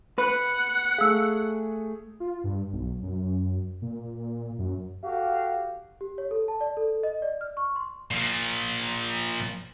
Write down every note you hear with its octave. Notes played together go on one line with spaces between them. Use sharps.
B4 F#5
A3 G#4 F5 E6
F4
G2
B1
F#2
A#2
F#2
F#4 G4 A4 F5
G4
C#5
A4
A5
D5
A4
D#5
D5
F6
C#6
C6
A#2 F3